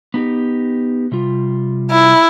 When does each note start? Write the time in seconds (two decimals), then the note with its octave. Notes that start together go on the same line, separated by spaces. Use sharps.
0.14 B3 D#4 G4
1.12 C3 G3 F4
1.91 E4